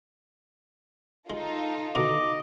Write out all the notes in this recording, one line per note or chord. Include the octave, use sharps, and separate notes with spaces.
G#3 D#4 F4 A4
B2 D3 D#3 D#5 D6